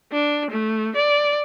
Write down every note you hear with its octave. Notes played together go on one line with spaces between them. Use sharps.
D4
A3
D5